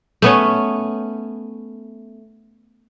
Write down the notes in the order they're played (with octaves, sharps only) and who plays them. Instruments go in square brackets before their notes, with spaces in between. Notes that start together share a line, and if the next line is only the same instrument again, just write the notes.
[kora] A3 B3 C#4